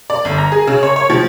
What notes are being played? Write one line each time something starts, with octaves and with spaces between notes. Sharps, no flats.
D5
G1
A#5
G#4
C#3
C#5
C#5
F3